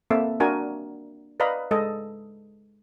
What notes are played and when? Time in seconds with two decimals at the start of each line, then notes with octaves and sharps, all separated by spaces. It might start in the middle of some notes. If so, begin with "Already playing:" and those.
0.10 A#3 C4 A4 E5
0.40 D4 F#4 A#4 G#5
1.40 B4 D5 D#5 F5 A#5 B5
1.71 G#3 A4 D#5